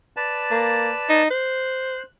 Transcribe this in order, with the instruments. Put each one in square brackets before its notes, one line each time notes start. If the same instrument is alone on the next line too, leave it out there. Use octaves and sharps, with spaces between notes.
[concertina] B4 D5 A5
[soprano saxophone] A#3
D#4
[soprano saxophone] C5 [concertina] F#6